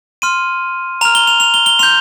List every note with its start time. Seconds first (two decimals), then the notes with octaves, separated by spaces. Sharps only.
0.22 C6 F6 D#7
1.01 A#5 F6 F7
1.15 G7
1.27 F7
1.40 F7
1.54 G7
1.66 G7
1.79 C6 G6 F7